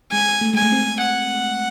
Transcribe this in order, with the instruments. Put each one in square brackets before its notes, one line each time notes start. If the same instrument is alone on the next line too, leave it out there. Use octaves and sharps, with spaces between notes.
[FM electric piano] G#3 [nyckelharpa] G#5
[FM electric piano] A3
[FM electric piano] G#3 [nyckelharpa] G#5
[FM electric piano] A3
C4
[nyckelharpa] F#5